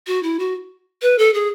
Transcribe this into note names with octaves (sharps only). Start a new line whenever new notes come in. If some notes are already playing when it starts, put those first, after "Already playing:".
F#4
E4
F#4
B4
A4
G#4